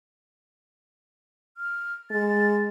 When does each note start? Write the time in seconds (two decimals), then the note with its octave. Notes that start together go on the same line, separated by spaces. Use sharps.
1.57 F6
2.11 G#3 A6